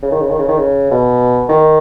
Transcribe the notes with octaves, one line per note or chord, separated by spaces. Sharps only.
C#3
D#3
C#3
D#3
C#3
D#3
C#3
B2
D#3